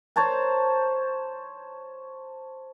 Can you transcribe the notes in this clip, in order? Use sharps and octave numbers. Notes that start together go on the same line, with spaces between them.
C5 C#5 A5 A#5